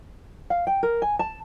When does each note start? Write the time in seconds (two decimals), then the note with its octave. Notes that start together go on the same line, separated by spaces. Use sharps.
0.50 F5
0.67 G5
0.83 A#4
1.02 G#5
1.19 A5